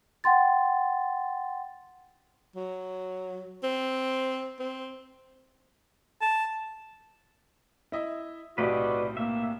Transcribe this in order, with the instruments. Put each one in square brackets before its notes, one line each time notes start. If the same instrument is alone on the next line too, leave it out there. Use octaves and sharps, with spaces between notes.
[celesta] F#5 G5 C6 A6
[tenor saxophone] F#3
C4
C4
[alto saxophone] A5
[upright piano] E4 D#5 E5
[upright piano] B1 A2 C3 [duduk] F#4 [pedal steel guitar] B4 D5 D#5
[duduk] A#3 [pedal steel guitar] E5